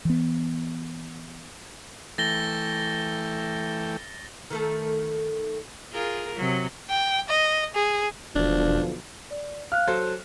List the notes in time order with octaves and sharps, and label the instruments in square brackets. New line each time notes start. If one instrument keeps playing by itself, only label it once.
[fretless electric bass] E3 B3
[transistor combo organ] E3 A3 G5 [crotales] A6 A#6 G7
[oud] D#3 A3 A4
[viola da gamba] F4 G#4 A#4
C3 F#3
[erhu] G5
D#5
G#4
[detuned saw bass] E1 [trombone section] B1 D3 F3 [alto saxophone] D4
[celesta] D5
[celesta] F5 F#6 [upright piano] F6
[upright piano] F#3 A4 C5 [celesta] F#6